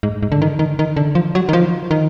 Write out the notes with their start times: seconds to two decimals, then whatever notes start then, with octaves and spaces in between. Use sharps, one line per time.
0.03 G#2
0.23 G#2
0.32 D3
0.42 D#3
0.59 D#3
0.79 D#3
0.97 D3
1.15 F3
1.35 F#3
1.49 D#3
1.53 F3
1.91 D#3